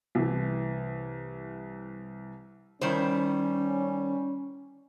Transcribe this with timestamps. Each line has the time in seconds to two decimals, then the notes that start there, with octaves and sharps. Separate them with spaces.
0.15 C2 E3
2.81 D#3 G3 C#4 E4 C5